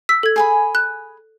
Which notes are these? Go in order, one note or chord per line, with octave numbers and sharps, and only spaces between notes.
E6 B6
A4 G#6
G#4 G#5 B5
F#6